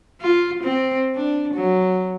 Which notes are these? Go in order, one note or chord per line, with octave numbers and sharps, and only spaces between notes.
F4
C4
D4
F#3